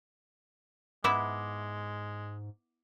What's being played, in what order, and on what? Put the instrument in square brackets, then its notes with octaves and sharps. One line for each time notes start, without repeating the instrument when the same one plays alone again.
[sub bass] G#2 [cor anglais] G#3 [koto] B3 E4 E5 [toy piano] D6